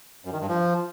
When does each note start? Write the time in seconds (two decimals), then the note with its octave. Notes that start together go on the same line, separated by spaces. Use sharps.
0.25 F#2
0.33 D#3
0.41 G2
0.49 F3